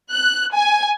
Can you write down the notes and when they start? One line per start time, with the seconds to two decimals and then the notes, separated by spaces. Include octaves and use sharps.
0.11 F#6
0.53 G#5